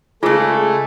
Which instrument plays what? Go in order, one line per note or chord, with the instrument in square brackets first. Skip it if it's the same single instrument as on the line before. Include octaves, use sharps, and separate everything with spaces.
[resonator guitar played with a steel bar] C#3 G#3 [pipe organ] A3 [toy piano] F4 G#4 A#4